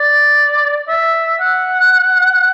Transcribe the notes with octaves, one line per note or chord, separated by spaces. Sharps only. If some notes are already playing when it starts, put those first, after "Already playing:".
Already playing: D5
E5
F#5